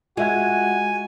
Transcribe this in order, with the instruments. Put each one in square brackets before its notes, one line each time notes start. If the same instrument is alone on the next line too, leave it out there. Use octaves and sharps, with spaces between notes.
[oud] G#3 [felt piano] F4 E5 G#6 [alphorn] F#4 [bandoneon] G#5